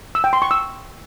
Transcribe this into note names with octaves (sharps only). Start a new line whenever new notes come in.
E6
G5
C6
C#6
E6